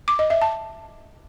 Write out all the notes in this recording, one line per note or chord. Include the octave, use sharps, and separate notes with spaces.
D6
D#5
E5
A5